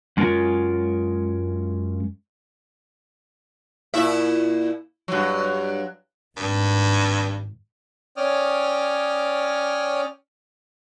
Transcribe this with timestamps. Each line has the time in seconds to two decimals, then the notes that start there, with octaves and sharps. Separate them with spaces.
0.17 F#2 G#3 C#4 F4 A#4
3.94 A#2 E4 E5
5.08 G2 F#3
6.37 G#1 G2
8.17 C#4 C#5 D5 G5 D#6 F6